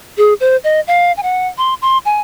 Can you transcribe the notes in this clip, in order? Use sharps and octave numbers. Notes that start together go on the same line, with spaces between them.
G#4
C5
D#5
F5
G#5
F#5
C6
C6
G#5